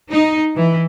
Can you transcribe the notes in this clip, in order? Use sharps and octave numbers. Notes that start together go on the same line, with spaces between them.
D#4
E3